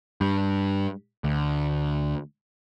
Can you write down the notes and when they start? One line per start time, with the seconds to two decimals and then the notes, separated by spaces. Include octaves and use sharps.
0.21 G2
1.24 D2